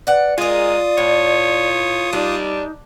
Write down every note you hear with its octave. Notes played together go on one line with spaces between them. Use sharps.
B4 D5 F#5
G#3 F4 G#4 A#4 D5 D#6
A2 C#5
G3 D4 D#4